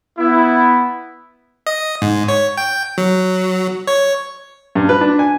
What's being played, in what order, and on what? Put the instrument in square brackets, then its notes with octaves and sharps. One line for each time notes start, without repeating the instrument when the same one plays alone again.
[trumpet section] B3 E4
[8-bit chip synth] D#5
G#2
C#5
G5
F#3
C#5
[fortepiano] G2
B4
D4
G#5